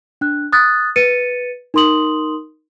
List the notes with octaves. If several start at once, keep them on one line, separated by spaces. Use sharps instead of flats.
D4 F#6
D#6 F#6 A6
B4 A6 C#7 D#7
D#4 A#4 C6 D#6 F#7